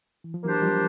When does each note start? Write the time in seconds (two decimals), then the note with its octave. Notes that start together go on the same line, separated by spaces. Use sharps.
0.24 E3
0.34 F3
0.44 E3 F#3 A#3 D4 G4 C5
0.62 F3 G3